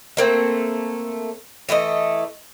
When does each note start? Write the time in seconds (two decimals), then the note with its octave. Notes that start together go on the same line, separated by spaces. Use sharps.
0.17 A3 A#3 C4
1.69 E3 A3 B4 D#5